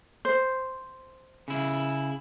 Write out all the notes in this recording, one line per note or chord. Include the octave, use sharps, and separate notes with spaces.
C5
C#3 E4